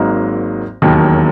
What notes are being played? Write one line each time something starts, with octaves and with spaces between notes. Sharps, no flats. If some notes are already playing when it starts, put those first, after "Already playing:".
Already playing: G#1 G#2 F#3 A#3 D#4
E1 D#2 D#3 F#3 A#3